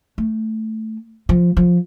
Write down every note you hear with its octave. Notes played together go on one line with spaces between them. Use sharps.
A3
F3
F3